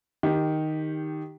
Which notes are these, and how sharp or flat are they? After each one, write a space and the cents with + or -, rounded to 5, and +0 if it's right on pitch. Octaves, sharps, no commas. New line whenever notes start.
D#3 +0 G4 +5